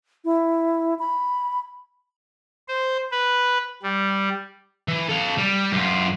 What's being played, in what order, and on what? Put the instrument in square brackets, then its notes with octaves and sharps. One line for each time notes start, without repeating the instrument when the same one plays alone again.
[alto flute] E4
B5
[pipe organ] C5
B4
G3
[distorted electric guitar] E3
A4 F5
G3
F#2 F4